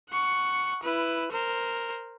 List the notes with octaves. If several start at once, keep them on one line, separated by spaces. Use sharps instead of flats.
F#5 C#6
E4 B4
A#4 C5